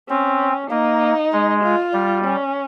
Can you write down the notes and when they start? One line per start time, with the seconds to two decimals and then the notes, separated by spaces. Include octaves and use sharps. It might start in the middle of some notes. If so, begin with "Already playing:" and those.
0.09 C4 C#4
0.70 A#3 D#4
1.32 G#3
1.63 F4
1.93 G3
2.24 C#4